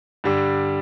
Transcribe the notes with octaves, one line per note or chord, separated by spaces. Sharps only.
G2 D3 G3 D4